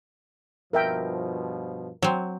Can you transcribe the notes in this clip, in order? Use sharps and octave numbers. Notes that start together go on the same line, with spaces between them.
G2 B2 F3 A#4 E5 G5
F#3 C4